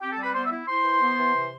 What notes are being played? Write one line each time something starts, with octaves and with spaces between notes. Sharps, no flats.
C4 G4 G5
A4 A5
G3
B4 B5
B3 C5 C6
E5 E6
E4
E4 C5 C6
E3
B3
E3
C3